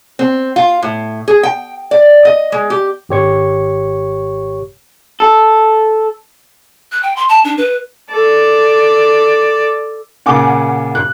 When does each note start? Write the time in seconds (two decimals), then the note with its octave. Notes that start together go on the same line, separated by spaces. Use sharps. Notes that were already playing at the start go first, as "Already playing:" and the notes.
0.19 C4
0.56 F4
0.83 A2
1.28 G#4
1.43 G5
1.91 D5
2.25 D#5
2.52 G#3
2.70 G4
3.09 G#1 G4 C#5 C#6
5.20 A4
6.92 F#6
7.03 G5
7.16 C6
7.29 A5
7.44 D4
7.58 B4
8.11 A4 D5
10.26 A#2 C#3 F#5 G#5 D6
10.95 F#6